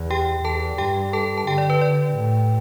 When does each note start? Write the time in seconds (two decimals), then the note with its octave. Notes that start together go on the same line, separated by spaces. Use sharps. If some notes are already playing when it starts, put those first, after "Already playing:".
Already playing: E2
0.10 G4 G5
0.44 E2 A4 A5
0.78 G2 G4 G5
1.13 A4 A5
1.38 A5
1.47 D3 G4 G5
1.58 D5
1.70 B4
1.81 D5
2.15 A2